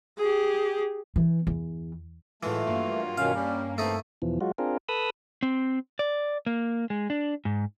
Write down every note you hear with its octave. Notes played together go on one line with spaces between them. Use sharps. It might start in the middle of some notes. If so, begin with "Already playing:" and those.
G4 G#4
E3
E2
A2 E3 F#3 G#3 A3 F4
G2 A#3
B2 D#3 C#4 F5
G3 C#4
C#3 E3 A3 C4 D#4 A4
E2 B2 E3 F3
F#3 G#3 F4 F#4
C4 D4 F4 G#4 A#4
A4 B4 B5 D#6 E6
C4
D5
A#3
G#3
D4
G#2